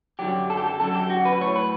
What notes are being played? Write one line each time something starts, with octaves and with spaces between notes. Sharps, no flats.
F#2 D3 F#3 G4
A4
G4
A4
F#2 D3 F#3 A4
G4
F#4
B4
A2 F#3 C#5
B4